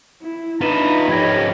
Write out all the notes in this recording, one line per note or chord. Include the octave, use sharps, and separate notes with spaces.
E4
D4 D#4 F4 B4 A#5 B5 D#7 E7
F3 C#4 G4 D#5 G#6 A#6